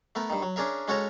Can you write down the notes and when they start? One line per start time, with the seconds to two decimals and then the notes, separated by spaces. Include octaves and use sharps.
0.15 A3 B3 A#4
0.30 G2 D#3
0.42 F#3
0.56 C#4 D4 G#4 A#4 E5
0.88 G#3 C#4 F#4 A4 C#5 A#5